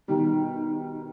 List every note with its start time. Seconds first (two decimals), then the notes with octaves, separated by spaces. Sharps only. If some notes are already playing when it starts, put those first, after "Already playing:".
0.08 B2 D#3 G3 D#4